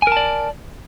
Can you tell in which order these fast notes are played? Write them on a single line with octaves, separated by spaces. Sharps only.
G#5 A#4 A5 D5